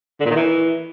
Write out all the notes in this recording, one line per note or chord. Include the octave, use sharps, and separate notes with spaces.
D3
A#2
D#3
E3